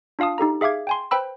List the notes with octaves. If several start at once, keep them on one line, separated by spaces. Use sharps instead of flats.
D4 F4 F5 A5 D#6
D#4 G4 A4 A#5
G#4 E5 F5 D6 G#6
G5 G#5 C6
B4 C5 G5 B5 E6